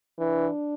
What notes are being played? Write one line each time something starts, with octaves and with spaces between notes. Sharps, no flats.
E3 D4